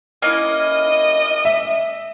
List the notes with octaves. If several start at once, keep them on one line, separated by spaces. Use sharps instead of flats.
A#3 C#4 E4 D#5
E5